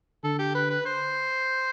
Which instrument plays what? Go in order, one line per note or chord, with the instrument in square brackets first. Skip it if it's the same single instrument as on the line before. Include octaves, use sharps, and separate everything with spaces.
[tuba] D3 [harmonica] A4
[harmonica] G4
B4
B4
C5